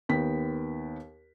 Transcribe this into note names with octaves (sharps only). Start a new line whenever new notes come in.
D#2 B3 G5 B6